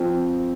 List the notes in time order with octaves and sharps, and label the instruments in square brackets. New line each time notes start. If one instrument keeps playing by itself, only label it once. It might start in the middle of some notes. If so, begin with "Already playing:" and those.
Already playing: [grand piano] F3 C4